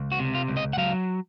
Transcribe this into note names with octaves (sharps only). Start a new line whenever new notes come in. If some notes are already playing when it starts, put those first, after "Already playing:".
Already playing: C#2
F#4
C3
F4
C#2
D#5
F#5
F#3 F5